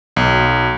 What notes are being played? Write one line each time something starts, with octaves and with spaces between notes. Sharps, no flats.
B1